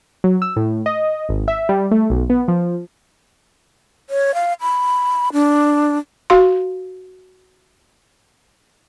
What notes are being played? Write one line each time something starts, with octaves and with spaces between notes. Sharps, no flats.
F#3
E6
A2
D#5
G#1
E5
G3
A3
B1
B3
F3
C#5
F5
B5
D4
F#4 F5 C6